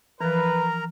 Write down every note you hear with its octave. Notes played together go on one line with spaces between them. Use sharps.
E3 F3 A#4 B4 A#5